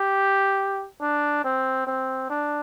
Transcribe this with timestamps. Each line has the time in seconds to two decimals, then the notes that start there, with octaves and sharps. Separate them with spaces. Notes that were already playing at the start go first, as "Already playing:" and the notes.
Already playing: G4
1.01 D4
1.44 C4
1.87 C4
2.30 D4